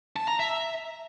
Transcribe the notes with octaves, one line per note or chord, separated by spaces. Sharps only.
A5
A#5
E5